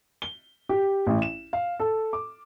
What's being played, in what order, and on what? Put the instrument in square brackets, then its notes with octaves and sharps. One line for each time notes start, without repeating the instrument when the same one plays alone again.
[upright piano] G7
G4
A1
E7
F5
A4
D6